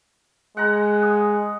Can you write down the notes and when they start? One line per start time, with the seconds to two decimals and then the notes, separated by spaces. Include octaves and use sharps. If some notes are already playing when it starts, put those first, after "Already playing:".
0.57 G#3 F#5 A#5
1.03 D#6